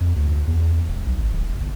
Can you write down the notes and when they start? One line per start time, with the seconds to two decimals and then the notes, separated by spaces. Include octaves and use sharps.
0.01 F2
0.16 D2
0.47 E2
0.89 E1
1.06 B1
1.18 G#1
1.32 D1
1.49 F1
1.61 G1